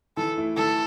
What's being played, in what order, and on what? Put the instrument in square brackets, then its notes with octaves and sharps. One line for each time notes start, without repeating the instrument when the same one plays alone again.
[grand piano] E3 [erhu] A4
[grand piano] A3 E4
[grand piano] E3 [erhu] A4